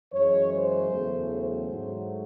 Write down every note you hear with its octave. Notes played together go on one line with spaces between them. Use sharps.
F#2 E3 G#3 C#5
C5
E2 C#3 F#3 A3
C5
G#2 F#3 A3